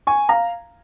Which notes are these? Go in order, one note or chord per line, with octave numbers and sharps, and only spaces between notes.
G#5 C#6
F5 A#5